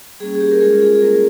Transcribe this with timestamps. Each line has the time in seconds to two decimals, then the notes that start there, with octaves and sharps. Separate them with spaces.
0.20 G3 A#3 C#4 G#4
0.35 G#4
0.40 G4
0.51 A#4
0.61 G#3 C#4 F4 G#4
0.82 G#4
0.96 G#4
1.02 G3 A#3 C#4 F4 A#4